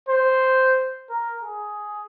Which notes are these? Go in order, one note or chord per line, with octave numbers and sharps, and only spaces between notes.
C5
A#4
G#4